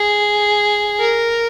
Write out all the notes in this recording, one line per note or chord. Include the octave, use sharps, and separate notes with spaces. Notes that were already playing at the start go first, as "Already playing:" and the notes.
Already playing: G#4
A#4